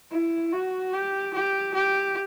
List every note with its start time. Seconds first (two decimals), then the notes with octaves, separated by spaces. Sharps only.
0.12 E4
0.53 F#4
0.94 G4
1.34 G4
1.74 G4